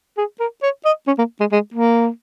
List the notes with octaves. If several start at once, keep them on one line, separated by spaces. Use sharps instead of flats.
G#4
A#4
C#5
D#5
C#4
A#3
G#3
G#3
A#3